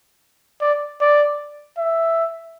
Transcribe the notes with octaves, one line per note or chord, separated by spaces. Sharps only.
D5
D5
E5